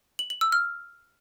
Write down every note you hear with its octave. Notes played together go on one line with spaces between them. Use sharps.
F#7
F#7
E6
F6